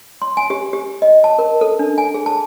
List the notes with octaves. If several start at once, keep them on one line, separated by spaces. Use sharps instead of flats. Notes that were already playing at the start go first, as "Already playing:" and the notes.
C6
G#5
G4
G4
D#5
A5
A#4
A4
D4
G#5
G#4
A5